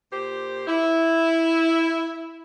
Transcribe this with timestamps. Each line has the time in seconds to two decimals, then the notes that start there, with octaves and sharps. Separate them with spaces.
0.13 A#2 G4 C5
0.68 E4